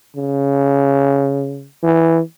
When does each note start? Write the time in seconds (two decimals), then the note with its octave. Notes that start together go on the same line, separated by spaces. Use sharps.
0.16 C#3
1.83 E3